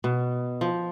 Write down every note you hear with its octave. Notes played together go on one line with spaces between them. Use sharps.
B2
F3